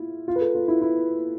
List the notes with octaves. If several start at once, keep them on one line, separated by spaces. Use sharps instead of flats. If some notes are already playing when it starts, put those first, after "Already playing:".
Already playing: E4 F4
F4
B4
A4
F4
E4
E4